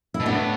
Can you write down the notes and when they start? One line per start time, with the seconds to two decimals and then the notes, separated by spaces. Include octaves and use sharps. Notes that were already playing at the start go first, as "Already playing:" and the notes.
0.14 E4
0.20 B2
0.26 A2 B3 D4